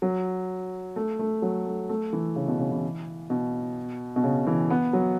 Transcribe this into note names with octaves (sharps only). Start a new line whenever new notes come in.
F#3
A3
A3
F#3
A3
A3
E3
C#3
B2
C#3
E3
B2
B2
C#3
E3
B3
F#3